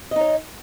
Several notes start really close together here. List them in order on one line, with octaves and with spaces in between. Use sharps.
D#5 D#4 C#5